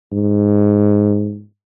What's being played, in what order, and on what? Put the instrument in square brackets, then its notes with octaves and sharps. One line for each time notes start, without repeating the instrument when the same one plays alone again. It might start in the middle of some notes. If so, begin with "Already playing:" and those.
[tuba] G#2